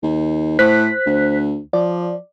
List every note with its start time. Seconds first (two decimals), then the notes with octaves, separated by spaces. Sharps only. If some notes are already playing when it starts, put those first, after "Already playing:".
0.03 D#2
0.59 A2 C5 F#6 B6
1.06 D2
1.73 F3 D5